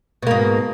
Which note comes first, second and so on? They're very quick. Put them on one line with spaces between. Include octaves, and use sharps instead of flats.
B2 A#3 G#2